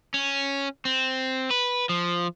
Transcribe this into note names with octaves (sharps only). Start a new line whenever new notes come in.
C#4
C4
B4
F3